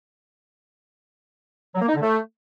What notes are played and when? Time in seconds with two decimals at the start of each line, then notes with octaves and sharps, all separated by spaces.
1.75 F#3
1.81 A#3
1.88 D#4
1.95 D3
2.01 A3